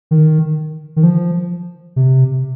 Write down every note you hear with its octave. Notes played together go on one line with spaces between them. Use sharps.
D#3
D#3
F3
C3